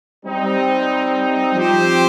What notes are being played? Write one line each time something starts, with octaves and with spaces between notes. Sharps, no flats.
G3 C4 D#4
F3 C4 G4 C5